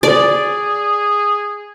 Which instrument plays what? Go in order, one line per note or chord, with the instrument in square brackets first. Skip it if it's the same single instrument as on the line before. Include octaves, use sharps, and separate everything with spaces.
[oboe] G#4 [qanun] D5